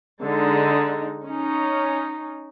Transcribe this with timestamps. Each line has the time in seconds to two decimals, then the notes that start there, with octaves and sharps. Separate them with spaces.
0.23 D3 G#3 D#4
1.23 C#4 D#4